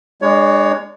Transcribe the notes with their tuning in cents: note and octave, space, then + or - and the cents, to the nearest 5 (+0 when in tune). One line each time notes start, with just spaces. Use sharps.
G#3 -20 D4 +30 C#5 +20